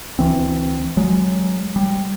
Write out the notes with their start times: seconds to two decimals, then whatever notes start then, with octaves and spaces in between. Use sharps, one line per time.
0.19 D2 E3 C4
0.97 F#3 G#3
1.76 G3